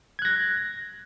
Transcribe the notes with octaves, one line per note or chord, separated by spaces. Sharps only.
F#6 G#6 A#6